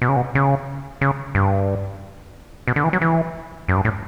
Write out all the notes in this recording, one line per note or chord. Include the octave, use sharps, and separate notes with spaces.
B2
C#3
B2
C#3
C#3
G2
B2
D3
E3
F#3
E3
F#2
G2
A2